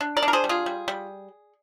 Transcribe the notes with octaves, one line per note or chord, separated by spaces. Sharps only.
D4
A#4 D5
D4
A#4
G#4 C5
G3
F4 G#4
G3
G3